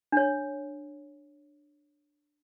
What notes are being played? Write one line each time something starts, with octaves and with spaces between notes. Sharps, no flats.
D4 C#5